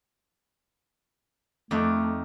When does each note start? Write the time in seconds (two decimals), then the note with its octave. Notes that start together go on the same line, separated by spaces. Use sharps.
1.71 F2 A3 D#4 D5